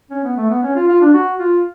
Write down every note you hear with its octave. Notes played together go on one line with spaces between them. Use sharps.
C#4
B3
A3
B3
C#4
F4
F4
D4
F#4
F4